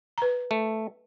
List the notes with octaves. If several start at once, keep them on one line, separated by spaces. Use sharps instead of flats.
B4 A#5
A3